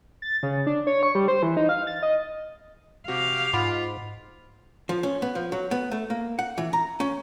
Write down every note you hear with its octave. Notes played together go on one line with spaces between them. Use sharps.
A6
C#3
D4
C#5
C#6
G3
C5
E3
D#4
F5
A6
D#5
C3 F#4 G4 F5
G#2 F4 F#5 B5 D6
F3
C#4
B3
F3
F#3
B3
A3
A#3
F#5
E3
A#5
C#4